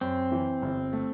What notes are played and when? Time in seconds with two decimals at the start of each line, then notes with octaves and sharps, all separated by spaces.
0.01 F#2 C4
0.32 E3
0.62 G1
0.93 A3